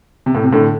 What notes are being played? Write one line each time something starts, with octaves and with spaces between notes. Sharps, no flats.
C3
A2
C3
A2 D3